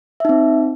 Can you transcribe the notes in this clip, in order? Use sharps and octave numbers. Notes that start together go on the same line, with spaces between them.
C4 D#4 E5